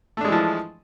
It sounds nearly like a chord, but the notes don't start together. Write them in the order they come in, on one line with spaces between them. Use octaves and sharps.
A3 D4 G#3 E3 F3